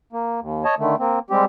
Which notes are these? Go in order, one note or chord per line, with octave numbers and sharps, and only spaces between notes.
A#3
D#2
C#5 D#5 A5
D3 D#3 A3
A#3 C4
G3 G#3 C4 G4